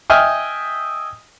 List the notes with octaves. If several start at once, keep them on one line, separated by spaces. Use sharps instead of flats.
D#5 E5 G5 G#5 F6